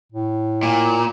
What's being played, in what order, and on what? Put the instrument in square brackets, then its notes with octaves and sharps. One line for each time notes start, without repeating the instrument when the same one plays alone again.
[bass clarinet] A2
[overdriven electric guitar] A#2